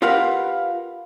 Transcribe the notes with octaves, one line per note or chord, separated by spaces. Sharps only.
F4 G4 A#4 B4 F5 F#5